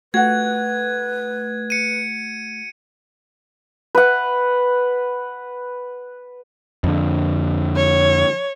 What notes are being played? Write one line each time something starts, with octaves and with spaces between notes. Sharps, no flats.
A3 F#4 B4 F#5 G#6
C#7 D#7
B4 F#5
F2 D3
C#5